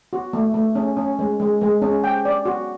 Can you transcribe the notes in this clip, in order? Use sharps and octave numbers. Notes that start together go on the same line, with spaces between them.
F#4
A3
A3
C#4
C#4
G#3
G#3
G#3
C#4
G5
D5
F#4